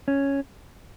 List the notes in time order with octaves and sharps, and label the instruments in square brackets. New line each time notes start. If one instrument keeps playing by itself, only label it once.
[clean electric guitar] C#4